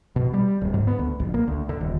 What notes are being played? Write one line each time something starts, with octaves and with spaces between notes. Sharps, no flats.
B2
G3
D1
G#2
B3
D2
A#1
A#3
D2
D3
D#1